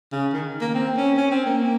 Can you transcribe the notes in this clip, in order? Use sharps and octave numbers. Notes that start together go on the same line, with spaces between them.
C#3
D#3
A#3
C4
C#4
C#4
C4
A#3